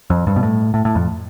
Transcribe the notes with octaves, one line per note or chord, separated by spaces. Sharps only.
F2
G2
B2
A2
A2
A2
F2